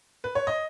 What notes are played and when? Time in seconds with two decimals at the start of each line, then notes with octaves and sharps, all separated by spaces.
0.24 B4
0.35 C#5
0.47 D#5